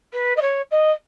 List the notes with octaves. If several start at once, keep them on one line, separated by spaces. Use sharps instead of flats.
B4
D#5
C#5
D#5